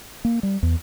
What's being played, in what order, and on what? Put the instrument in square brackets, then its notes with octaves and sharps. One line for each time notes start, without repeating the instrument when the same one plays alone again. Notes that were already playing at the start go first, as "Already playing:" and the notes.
[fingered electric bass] A#3
G3
E2